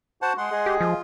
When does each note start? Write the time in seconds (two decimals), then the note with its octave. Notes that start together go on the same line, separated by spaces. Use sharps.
0.22 F#4 C5 F#5 A5
0.38 G#3 F#5 C6
0.51 G#3 G#4
0.66 G4
0.81 F3 F4